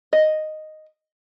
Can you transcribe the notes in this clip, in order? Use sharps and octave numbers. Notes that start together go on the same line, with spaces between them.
D#5